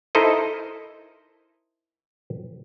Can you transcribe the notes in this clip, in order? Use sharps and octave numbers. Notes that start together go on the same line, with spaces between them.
D#4 E4 A4 A#4 C5 D#5